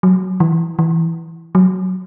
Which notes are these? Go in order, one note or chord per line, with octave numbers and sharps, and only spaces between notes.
F#3
E3
E3
F#3